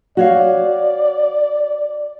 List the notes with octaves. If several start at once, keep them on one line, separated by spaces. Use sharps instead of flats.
F#4 C#5 D5 F5